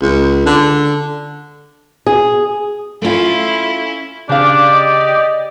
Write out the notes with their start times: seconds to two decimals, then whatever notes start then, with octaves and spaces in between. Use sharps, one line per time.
0.02 C#2
0.46 D3
2.07 G#4
3.02 A3 C#4 E4 F4
4.29 C#3 D4 G4 D5 F5
4.72 D#5